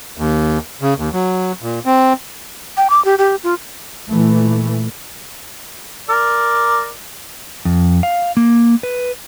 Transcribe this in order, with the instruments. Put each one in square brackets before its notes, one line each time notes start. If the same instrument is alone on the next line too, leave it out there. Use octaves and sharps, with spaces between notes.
[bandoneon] D#2
C#3
D#2
F#3
A#2
C4
[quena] G5
D6
G4
G4
F4
[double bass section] A#2 E3 A3
[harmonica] A#4 D5
[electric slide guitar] F2
F5
A#3
B4